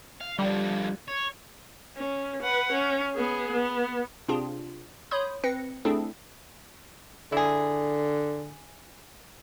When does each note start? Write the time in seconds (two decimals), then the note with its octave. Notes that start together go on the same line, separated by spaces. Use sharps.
0.21 F5
0.39 D3 F3 G3
1.08 C#5
1.96 C#4
2.43 B4 F#5
2.72 C#4
3.15 B3 G#4
3.52 B3
4.28 C3 C4 D4 F4 G#4
5.11 C#5 B5 C6 D#6 G6
5.44 C4 B4 A#6 C#7
5.85 A3 C4 D4 E4 G#4 A4
7.32 D3 E4 G#4